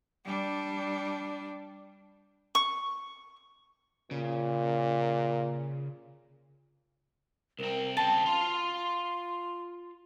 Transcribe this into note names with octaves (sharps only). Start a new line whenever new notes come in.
G3 D4
C#6
A#2 C#3
C2 C4 A#4
C#3 C4 G5 A5
F4 F5 C6